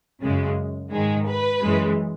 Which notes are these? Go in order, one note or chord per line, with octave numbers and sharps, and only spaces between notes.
F#2 C#3 G#3
G#2 D#3 G#3
B4
F#2 E3 G#3